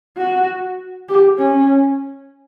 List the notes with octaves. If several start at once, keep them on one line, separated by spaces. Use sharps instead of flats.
F#4
G4
C#4